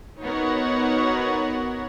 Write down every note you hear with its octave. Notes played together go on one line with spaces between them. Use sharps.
B3 D#4 F#4 A#4 C#5 F#5